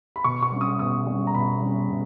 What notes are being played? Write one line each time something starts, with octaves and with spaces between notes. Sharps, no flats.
B5
B2 C#6
C#6
G3 C#4
D#6
B2 D#6
G3 C#4
A#5
B2 B5
G3 C#4
B2